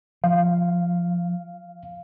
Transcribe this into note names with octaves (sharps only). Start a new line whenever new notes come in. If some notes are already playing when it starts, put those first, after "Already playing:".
F3 F5